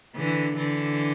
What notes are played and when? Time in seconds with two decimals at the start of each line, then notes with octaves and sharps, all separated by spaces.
0.15 D3 E3
0.56 D3 E3